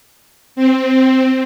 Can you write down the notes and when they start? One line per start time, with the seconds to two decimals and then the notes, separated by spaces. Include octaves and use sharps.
0.56 C4